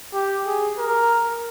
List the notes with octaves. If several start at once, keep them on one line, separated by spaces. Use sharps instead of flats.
G4
G#4
A#4